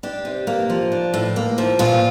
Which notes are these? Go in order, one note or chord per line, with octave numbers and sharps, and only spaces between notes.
D4 G4
C3
A#3
F3
D4
A2
A#3
F3
A#2 F4